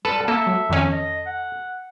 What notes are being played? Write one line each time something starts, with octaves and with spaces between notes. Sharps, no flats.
G3 A4 B4 A5
A#3 A4 E5
F#3
F2 D#3 C#4
D#5
F#5